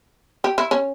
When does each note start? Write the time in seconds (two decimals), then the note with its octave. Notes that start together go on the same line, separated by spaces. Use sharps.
0.44 G4
0.58 E4
0.71 C#4